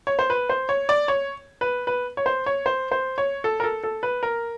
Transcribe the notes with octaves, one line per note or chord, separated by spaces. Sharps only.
C#5
C5
B4
C5
C#5
D5
C#5
B4
B4
C#5
C5
C#5
C5
C5
C#5
A4
A#4
A4
A4
B4
A#4